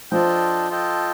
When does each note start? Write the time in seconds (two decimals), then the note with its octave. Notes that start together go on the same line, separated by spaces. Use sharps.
0.11 F3 D4 F4 A4 D#5 G5
0.70 F4 A4 D#5 G5